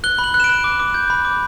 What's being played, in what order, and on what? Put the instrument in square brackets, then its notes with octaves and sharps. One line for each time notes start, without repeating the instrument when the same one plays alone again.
[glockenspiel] F#6 G7
B5
F#7
F#6
E7
D7
F#6
D6
D6
G6
B5
D6